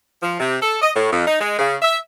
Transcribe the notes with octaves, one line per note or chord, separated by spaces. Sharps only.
F3
C3
A4
D#5
A2
F2
D#4
G#3
C#3
E5